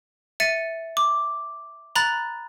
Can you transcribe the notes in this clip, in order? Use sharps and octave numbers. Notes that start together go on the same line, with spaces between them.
E5 A6 C#7 D#7
D6
A#5 B5 F#6 A6